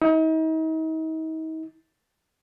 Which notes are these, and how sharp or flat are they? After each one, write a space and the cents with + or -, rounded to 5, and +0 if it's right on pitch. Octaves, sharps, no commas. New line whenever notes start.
D#4 +40